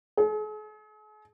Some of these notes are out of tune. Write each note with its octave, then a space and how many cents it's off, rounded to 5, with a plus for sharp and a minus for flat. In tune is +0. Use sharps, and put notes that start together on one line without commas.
G#4 +45